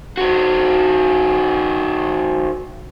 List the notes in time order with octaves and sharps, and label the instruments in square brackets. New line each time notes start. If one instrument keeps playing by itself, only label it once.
[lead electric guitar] D#3 F#4